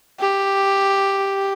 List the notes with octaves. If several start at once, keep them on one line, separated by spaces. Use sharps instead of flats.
G4